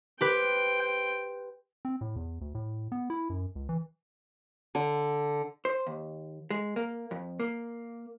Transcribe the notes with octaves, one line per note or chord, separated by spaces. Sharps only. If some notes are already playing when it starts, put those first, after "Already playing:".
G4 B4 C5 G5
C4
A2
E2
D2
A2
B3
E4
F#2
C#2
E3
D3
C5
D#2
G#3
A#3
F2
A#3